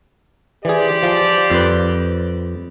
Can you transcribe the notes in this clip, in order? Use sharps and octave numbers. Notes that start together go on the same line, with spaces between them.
E3 G4 G#4 C5 D5
F3
F2 B4